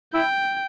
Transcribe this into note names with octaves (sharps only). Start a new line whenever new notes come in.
E4 G5